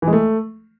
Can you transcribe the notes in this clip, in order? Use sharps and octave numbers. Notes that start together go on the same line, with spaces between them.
E3
G#3
A3